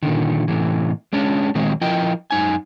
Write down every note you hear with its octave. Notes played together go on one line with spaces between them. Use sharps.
A#2 D3 D#3
A2 C3 E3
G#3 C#4 D4
A#2 D#3 F#3 G#3 C4
F3 E4 A#4 D#5 G5
F#2 D#4 G#5